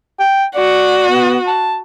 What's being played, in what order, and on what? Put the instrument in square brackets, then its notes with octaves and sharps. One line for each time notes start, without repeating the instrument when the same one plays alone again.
[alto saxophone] G5
[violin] F#4 [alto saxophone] D5
[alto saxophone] B3
A5